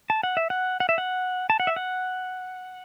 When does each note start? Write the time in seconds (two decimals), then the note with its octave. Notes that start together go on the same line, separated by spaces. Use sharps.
0.10 A5
0.23 F#5
0.37 E5
0.50 F#5
0.80 F#5
0.89 E5
0.98 F#5
1.50 A5
1.60 F#5
1.67 E5
1.76 F#5